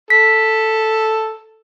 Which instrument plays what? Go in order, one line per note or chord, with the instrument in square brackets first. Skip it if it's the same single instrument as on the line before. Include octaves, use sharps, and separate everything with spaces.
[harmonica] A4 [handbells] B6